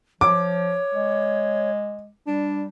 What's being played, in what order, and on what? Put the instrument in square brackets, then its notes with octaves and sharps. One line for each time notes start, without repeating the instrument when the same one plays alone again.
[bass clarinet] F3 [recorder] C#5 [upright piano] D6
[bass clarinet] G#3
[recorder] G3 [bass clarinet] D4